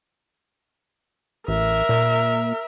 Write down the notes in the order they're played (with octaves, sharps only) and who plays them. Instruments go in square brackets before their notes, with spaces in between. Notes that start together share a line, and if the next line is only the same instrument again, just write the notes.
[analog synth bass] A1 [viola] A#4 E5
[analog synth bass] A#2